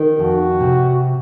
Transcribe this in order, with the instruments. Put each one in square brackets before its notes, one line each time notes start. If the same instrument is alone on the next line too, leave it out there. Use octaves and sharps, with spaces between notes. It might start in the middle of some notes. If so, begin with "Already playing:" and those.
Already playing: [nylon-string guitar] D#3
[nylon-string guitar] F2 [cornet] F#4
[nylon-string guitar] C3